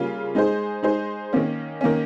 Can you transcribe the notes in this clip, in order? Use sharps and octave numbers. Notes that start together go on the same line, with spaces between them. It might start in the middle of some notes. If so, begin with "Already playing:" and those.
Already playing: C#3 G3 A#3 C#4 F4
G#3 D#4 G#4 C5
G#3 D#4 G#4 C5
D#3 A#3 C#4
D#3 A#3 C#4